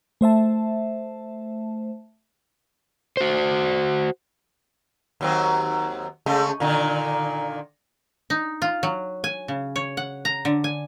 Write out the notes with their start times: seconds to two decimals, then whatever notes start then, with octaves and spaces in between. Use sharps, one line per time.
0.21 A3 C5 E5 A5
3.17 F#4 C5
5.21 D#2 F#3 C4
6.26 C#3 G#3 A3
6.60 A#2 D3 D#3
8.30 D#4
8.62 F4
8.83 F#3
9.24 G#5
9.48 C#3
9.76 C#5
9.97 F#5
10.25 A#5
10.45 D3
10.64 G#5